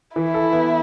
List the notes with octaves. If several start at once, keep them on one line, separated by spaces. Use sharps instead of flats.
E3 E4
A4
B3